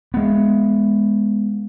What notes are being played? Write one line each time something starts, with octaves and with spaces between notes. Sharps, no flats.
G#3 B3